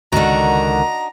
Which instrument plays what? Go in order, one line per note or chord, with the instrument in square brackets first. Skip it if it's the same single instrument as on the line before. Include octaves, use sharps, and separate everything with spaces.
[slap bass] C#2 [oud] D3 D#3 [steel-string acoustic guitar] D4 D#4 F#4 [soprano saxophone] A#5